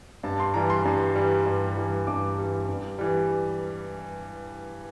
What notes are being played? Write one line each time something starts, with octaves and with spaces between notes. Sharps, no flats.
G2 A5
C6
E3 G3 A#5
C6
G2
E3 G3
G2
E3 G3
G2 D6
E3 G3
G2
E3 G3